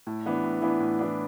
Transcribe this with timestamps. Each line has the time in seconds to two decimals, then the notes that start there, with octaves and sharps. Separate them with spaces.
0.07 A2
0.26 E3 B3 D4
0.44 A2
0.62 E3 B3 D4
0.80 A2
0.99 E3 B3 D4